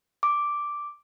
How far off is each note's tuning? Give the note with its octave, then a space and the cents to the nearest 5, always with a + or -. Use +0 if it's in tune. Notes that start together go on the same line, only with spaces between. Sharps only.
D6 +0